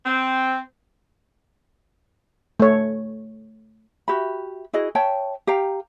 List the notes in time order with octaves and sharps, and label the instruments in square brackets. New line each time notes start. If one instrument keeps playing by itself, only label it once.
[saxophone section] C4
[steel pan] A3 C#5
[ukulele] F#4 G4 E5 B5
E4 F#4 G#4 D#5
C#5 E5 G5 A5
G4 F5 G5 A#5